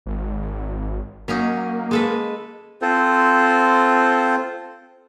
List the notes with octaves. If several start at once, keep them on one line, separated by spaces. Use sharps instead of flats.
G#1
F#3 A#3 C#4 D#4
G#3 A4 B4
C4 F4 A4 C5